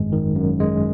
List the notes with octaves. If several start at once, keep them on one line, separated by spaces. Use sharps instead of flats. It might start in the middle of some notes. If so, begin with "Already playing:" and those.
Already playing: G#1 F#2 G#3
D#3
F#2
G#3